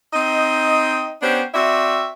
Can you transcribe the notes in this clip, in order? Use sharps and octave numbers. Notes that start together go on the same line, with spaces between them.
C4 D#4 D#5
B3 C#4 D4 G4 C5
C4 F#4 D5 E5